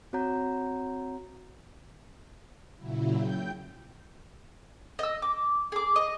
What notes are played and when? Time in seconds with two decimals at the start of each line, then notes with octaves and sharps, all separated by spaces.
0.13 C4 F#4 C#5 F#5 A#5 G6
2.76 A#2 C#3 F#3 E4
3.15 G5 G6
4.99 D#5 E6
5.22 D6
5.72 G#4 D6
5.96 D#5